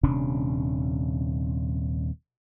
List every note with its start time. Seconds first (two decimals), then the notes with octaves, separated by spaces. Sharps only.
0.03 D#1 C3 C#4 D4